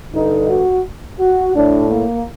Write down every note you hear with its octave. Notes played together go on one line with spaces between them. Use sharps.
G2 D3 D#4
F#4
F#4
A2 D4
A#3